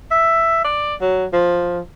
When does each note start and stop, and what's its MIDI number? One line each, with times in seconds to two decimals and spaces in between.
0.11 0.64 76
0.64 0.95 74
1.01 1.25 54
1.33 1.79 53